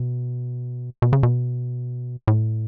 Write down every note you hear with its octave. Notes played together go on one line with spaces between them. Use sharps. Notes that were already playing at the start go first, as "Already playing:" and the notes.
Already playing: B2
B2
C#3
B2
A2